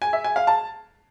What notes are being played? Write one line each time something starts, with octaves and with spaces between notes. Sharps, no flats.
G#5
E5
G#5
F5
A5